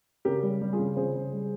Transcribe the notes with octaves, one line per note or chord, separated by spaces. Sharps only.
C#3 G4 A#4
G3
G3
F4 G#4
C#3
C#3 G#4 C5
C#3
G3